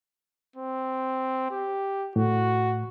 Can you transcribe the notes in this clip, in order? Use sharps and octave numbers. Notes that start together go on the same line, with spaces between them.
C4
G4
A2 F#4